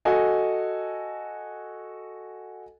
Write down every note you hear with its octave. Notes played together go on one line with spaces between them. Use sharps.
F#4 A4 D#5 G#5